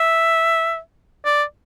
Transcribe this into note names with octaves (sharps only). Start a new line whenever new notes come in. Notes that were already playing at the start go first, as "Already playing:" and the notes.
Already playing: E5
D5